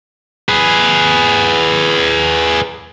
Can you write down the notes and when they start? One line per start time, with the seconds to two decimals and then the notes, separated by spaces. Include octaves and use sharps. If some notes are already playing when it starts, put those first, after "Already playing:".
0.49 G#4 B4